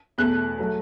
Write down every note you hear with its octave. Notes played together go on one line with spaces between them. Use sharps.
E2 B2 A3 F#6
F#3 A3